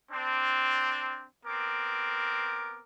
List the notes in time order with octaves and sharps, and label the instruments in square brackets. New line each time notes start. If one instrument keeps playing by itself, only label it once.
[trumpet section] C4 D4
B3 C4 A#4 D6